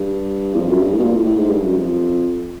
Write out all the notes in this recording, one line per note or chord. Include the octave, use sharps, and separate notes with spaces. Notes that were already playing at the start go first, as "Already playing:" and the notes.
Already playing: G2
E2
F2
F#2
G2
A2
B2
A#2
A2
A2
G#2
G2
F#2
F2